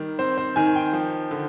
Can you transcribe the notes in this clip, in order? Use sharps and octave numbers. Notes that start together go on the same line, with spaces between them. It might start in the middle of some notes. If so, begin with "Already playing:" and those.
Already playing: D#3 G3 A#4
C4 C5
C5
D#3 G#5
G#5
G5
F3
D3